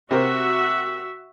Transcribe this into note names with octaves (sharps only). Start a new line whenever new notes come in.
C3 C4 F#4 A#4 E5